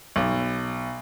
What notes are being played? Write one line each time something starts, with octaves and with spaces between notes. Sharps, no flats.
B1